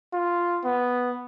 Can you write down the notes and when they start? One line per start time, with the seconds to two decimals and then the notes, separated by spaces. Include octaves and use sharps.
0.13 F4
0.64 B3